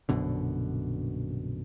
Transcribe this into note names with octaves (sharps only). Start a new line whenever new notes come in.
A#1 F#2 B2 D3